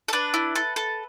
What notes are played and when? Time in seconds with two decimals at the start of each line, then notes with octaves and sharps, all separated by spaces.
0.08 A4
0.13 D4 B4
0.34 E4
0.55 A4
0.76 A4